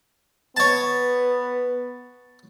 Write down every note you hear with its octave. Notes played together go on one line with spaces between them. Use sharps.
B3 C#5 A5